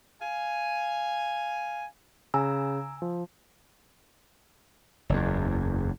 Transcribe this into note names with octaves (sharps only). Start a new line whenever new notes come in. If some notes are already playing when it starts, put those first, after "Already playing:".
F5 G#5
C#3 G#5 A#5 E6
F3
F#1 E2